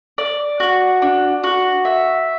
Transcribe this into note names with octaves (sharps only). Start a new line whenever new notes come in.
D5
F#4
D4
F#4
E5